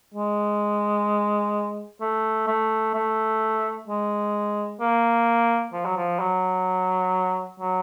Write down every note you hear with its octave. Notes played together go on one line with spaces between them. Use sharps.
G#3
A3
A3
A3
G#3
A#3
F3
F#3
F3
F#3
F#3